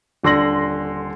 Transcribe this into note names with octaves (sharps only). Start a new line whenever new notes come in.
D#1 D3 C6 A#6 F#7